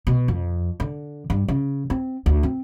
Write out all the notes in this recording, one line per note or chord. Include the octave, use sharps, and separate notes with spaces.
B2
F2
D3
G2
C#3
C4
D2
C4